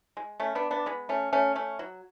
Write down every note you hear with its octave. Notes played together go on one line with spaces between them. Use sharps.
G#3
A3 C#4
B3 D4
B3 D4
G#3 B3
A3 C#4
A3 C#4
A3 C#4
F#3